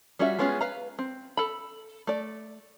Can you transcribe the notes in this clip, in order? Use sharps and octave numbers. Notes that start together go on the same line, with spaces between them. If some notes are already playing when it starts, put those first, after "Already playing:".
G3 C#4 F4 F#4 E5
G#3 B3 C#4 F4 G#4
B4 F5 A#5
C4
A4 B5
A3 D5